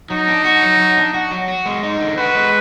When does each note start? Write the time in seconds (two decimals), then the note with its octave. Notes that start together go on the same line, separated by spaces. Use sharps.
0.10 F#3 D#4
0.28 D4
0.44 F#4
0.62 F#3
0.80 F#3
0.97 D4
1.14 F#4
1.31 F#3
1.48 F#4
1.66 G#3
1.83 D#4
2.00 D3
2.17 F#4 B4
2.35 G#3